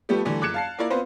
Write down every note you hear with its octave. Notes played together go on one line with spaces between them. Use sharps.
F3 G3 A3 B3 G4
D3 E3 G3 A3
F#1 D6 F#6 G#6 C#7 E7
F5 A5 C7
A#3 E4 F4 A#4 D5
B3 C4 F4 B4 C5